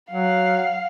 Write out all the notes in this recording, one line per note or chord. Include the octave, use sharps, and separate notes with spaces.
F#3 F5 F#5